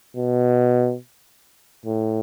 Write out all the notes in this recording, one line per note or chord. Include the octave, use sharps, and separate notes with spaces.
B2
A2